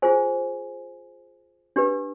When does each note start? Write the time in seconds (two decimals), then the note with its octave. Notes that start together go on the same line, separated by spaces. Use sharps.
0.02 F4 G#4 C5 G#5
1.76 D4 G4 B4